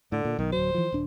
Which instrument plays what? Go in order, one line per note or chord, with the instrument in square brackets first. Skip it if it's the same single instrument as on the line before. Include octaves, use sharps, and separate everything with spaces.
[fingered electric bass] A2 [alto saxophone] D3
[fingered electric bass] A#2
[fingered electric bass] B1 [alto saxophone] D#3
[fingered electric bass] D1 F#3 [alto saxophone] C5
[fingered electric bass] E3 F3
D#1 D4